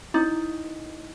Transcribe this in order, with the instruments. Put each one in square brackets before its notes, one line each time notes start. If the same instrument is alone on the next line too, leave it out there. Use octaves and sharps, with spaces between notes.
[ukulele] D#4 [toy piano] E4